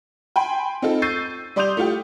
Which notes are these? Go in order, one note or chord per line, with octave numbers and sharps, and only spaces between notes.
G5 G#5 B5 C6
C4 D#4 F4 A4
C#6 E6 G6 A6 C7 D#7
G3 D5 C6 D#6 G6 F7
A3 E4 F4 G4